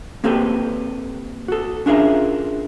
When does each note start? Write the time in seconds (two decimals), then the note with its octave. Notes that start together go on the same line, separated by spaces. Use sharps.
0.24 A#3 C4 G4 A4 B4
1.48 F#4 A4
1.86 C#4 D4 F4 G#4 A#4 E5